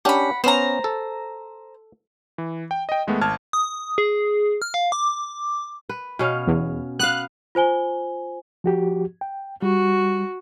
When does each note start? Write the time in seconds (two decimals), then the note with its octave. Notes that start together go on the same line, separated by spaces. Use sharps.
0.05 C#4 D4 G4 F#5 B5
0.44 B3 C#4 C5 A#5
0.84 A4
2.38 E3
2.71 G5
2.89 D#5 G5
3.07 D#2 G#3 A3 B3
3.21 G#1 A5 F6 G#6
3.53 D#6
3.98 G#4
4.62 F6
4.74 F5
4.92 D6
5.89 B4
6.19 B2 C#4 F5
6.47 E2
6.99 B3 F5 F#6
7.55 F4 C5 G#5 G7
8.64 F3 F#4 G4
9.21 G5
9.62 G3 F#4